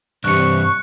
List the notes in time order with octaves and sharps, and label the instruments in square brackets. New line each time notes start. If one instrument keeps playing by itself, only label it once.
[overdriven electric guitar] G2 E3 [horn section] C3 D4 [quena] C#6 [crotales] F#6 C#7